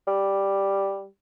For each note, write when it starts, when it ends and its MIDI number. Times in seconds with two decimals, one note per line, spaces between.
0.07 1.05 55